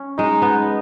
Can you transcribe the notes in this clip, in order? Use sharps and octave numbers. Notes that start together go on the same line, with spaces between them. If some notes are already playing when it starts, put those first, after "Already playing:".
Already playing: C#4
G#3 D#4
B3